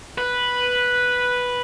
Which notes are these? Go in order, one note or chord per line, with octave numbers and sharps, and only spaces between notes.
B4